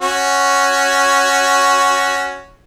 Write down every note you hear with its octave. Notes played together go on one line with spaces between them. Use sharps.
C#4 F#4